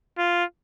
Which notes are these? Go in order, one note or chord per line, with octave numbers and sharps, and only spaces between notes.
F4